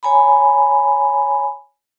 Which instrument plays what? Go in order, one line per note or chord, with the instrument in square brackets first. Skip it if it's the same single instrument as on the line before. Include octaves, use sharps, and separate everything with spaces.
[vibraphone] C#5 G#5 A#5 B5